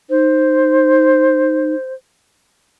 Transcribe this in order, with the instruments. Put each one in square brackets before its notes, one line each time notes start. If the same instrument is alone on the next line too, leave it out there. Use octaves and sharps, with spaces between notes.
[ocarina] D#4 [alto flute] C5